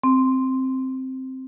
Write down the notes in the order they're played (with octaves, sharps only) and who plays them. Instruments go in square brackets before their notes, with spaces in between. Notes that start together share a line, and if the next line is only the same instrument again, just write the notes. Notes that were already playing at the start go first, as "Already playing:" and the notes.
[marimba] C4